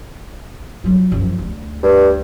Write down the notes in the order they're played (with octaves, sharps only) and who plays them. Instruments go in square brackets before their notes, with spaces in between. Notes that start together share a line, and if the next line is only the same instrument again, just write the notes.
[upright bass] F#3 F4
F#2 F3
D2
[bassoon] G2